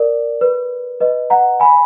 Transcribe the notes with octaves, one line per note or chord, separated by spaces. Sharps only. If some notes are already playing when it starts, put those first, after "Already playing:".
Already playing: A#4 D5
B4
B4 D#5
F#5 A#5
G#5 B5